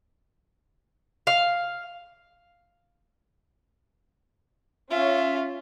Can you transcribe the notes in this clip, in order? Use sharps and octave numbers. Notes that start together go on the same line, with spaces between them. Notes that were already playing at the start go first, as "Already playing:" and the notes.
F5
C#4 F4 E5